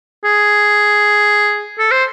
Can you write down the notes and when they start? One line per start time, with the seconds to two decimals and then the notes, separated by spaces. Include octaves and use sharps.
0.24 G#4
1.79 A4
1.91 C5